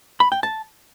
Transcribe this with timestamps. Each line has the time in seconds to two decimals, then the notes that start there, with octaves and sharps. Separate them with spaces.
0.20 B5
0.32 G5
0.43 A5